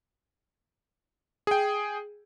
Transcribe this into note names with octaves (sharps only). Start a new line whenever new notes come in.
G#4 G5